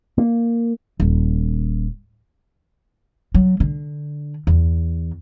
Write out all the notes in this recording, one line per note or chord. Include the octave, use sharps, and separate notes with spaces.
A#3
D#1
F#3
D3
E2